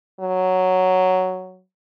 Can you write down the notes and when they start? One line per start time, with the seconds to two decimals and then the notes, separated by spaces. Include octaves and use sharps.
0.20 F#3